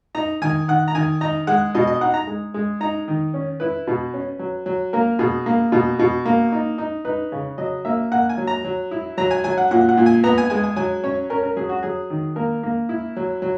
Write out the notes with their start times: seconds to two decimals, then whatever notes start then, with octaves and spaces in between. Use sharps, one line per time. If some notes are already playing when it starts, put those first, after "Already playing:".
0.15 D#4 A#5
0.42 D#3 G#5
0.68 D#3 F#5
0.88 A#5
0.95 D#3 G#5
1.21 D#4 A#5
1.47 G#3 F#5
1.75 B2 D#5
1.87 D#5
2.01 D#4 F#5
2.14 A#5
2.27 G#3
2.54 G#3
2.80 D#4 A#5
3.08 D#3
3.34 C#4
3.60 E4 B4
3.87 B2
4.14 C#4
4.39 F#3
4.66 F#3
4.93 A#3 A#4
5.19 B2 G#4
5.46 A#3
5.72 B2
5.99 B2
6.26 A#3
6.52 D#4
6.78 D#4
7.05 D#4 B4
7.32 C#3
7.58 F#3 D#5
7.85 A#3 E5
8.12 A#3 F#5
8.29 G#5
8.37 F#3
8.47 A#5
8.64 F#3
8.91 E4
9.17 F#3 A#5
9.31 G#5
9.44 F#3 G#5
9.58 F#5
9.71 A#2 F#5
9.89 F#5
9.97 A#2
10.06 G#5
10.24 B3 A#5
10.38 G#5
10.50 G#3 G#5
10.64 G#5
10.76 F#3 G#5
11.04 C#4 C#5
11.30 C#4 A#4
11.43 A#4
11.56 F#3 G#4
11.69 F#4
11.83 F#3 G#4
12.10 D#3
12.36 A#3 A#4
12.63 A#3
12.89 E4
13.16 F#3
13.42 F#3